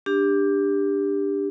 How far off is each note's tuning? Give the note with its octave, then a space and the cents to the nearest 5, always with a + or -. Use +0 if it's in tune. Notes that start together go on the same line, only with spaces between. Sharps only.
D4 +0 G4 +20